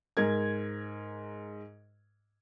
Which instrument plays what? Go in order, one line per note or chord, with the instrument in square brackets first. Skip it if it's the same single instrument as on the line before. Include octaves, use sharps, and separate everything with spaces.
[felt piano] G#2 A#4 G#6